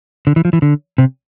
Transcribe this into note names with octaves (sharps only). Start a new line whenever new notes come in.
D3
E3
F3
E3
D3
C3